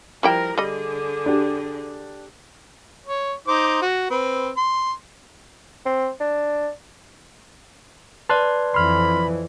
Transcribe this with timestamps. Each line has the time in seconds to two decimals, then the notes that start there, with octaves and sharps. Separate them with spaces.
0.23 F3 G3 E4 A#4 G5
0.58 D3 G3 G#4 D#5
1.26 D4 G4
3.06 C#5
3.47 D#4 C5 D6
3.82 F#4
4.10 C4 B4
4.57 C6
5.85 C4
6.20 D4
8.29 B4 D5 A5 C6 F#6
8.74 F2 E3 B5 C6 F6